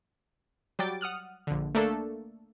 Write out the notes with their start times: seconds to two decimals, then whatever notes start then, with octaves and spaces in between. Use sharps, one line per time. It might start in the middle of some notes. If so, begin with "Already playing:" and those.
0.79 F#3 G3 G5 D6 A6 D7
1.01 F#5 D#6 F6 F#6
1.47 A#1 D3
1.75 A3 A#3 D4 A4